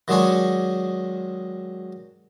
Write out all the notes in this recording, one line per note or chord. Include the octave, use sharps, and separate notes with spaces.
D#3 F#3 G#3 D4 G#4 C#5